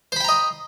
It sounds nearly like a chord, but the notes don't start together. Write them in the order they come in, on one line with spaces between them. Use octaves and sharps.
C5 B5 G5 A#5 D#5